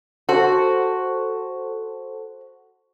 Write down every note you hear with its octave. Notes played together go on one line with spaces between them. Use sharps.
F#4 A4 C5